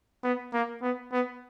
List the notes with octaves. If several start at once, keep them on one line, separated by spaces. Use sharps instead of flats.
B3
A#3
B3
B3